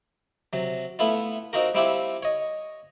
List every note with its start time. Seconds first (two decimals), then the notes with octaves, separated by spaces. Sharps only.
0.53 C3 F#3
0.99 A3 B3 E4 F4
1.53 C4 D#4 F4 F#4 A#4
1.75 G3 C4 E4 F4 G4 E5
2.23 C#5 D#5